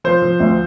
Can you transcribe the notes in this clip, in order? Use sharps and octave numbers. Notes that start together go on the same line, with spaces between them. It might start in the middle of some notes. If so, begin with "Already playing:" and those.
F3 C5
F3
D2